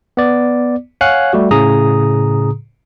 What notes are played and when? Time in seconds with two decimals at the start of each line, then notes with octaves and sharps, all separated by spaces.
0.17 B3 D5
1.01 C#5 F5 F#5 G#5 F#6
1.33 G3 A3 F#4 G4
1.51 A2 C#3 G#4 A#5 D#6